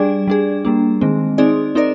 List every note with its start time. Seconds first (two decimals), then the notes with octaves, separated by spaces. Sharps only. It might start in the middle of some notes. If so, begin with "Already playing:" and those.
Already playing: G3 D4 G#4 D5
0.28 G3 D4 G#4
0.65 G3 A#3 D4
1.01 D#3 G#3 C4
1.38 C4 D#4 G#4 D5
1.75 C4 D#4 A#4 D5